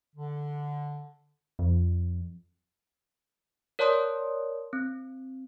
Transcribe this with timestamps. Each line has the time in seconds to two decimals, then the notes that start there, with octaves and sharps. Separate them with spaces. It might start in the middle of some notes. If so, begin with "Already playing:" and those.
0.15 D3
1.59 F2
3.79 A#4 C#5 D5 A5 C6 D#6
4.73 C4